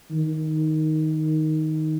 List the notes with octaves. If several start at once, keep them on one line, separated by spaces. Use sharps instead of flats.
D#3